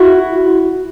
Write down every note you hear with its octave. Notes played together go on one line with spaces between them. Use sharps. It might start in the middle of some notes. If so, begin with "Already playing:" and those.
Already playing: E4 F#4